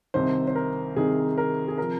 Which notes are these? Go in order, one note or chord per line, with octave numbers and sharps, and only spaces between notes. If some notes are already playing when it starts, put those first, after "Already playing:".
C2 C3 D#3 C5
C5
A#4
C2 C3 D#3 G#4
A#4
G#4
C3 F3 A#4